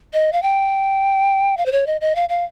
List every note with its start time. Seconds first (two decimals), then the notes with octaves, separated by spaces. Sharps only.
0.13 D#5
0.33 F5
0.42 G5
1.57 F5
1.66 C5
1.72 C#5
1.87 D#5
2.01 D#5
2.16 F5
2.29 F5